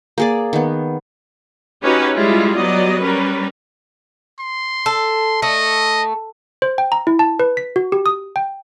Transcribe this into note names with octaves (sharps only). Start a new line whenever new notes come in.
A#3 G#4 D5
D#3 B3
C#4 D#4 F#4 G4 B4 C#5
G3 G#3 E4 F4
F#3 G3 B3 D5 D#5
G3 C#4 A#4 B4
C6
A4
A3 D#5
C5
G5
A#5
E4
A5
B4
B6
F#4
G4
D#6
G5